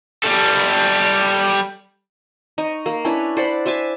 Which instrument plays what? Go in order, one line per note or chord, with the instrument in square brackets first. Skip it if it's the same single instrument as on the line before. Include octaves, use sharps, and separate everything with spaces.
[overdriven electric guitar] G3 A4
[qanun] D#4 D#5 C#6
A#3
C#4 D4 E4 B4
C5 D5 F#5 B5
C5 E5 G#5 D6